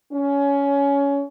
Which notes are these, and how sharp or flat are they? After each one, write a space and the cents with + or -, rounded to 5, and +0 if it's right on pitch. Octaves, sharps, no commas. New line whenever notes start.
C#4 +20